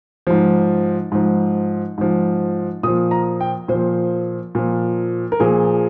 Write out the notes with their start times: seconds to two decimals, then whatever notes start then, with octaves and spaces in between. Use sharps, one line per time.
0.27 G#2 F3
1.12 G#2 F3
1.98 G#2 F3
2.83 A#2 D#6
2.88 F3
3.11 A#5
3.41 G5
3.68 A#2 F3 C5
4.55 A#2 F3
5.32 A#4
5.40 A#2 F3 G#4